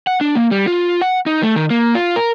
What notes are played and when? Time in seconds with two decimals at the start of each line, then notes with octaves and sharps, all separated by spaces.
0.07 F#5
0.21 D4
0.35 A#3
0.51 G3
0.67 F4
1.01 F#5
1.26 D#4
1.43 A3
1.56 D#3
1.70 A#3
1.95 F4
2.16 A#4